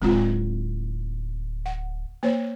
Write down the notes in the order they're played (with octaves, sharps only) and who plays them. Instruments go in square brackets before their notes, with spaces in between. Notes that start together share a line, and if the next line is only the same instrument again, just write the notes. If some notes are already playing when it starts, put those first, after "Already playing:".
[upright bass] D1 [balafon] G#3 C4 F4
[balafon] F#5
A#3 C5 C#5